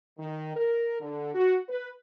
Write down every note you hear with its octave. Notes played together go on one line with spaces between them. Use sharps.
D#3
A#4
D3
F#4
B4